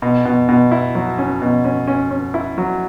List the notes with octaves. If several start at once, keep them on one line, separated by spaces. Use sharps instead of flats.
B2
B2
B2
E4
F#3
C#4
B2
C#4
C#4
C#4
E4
F#3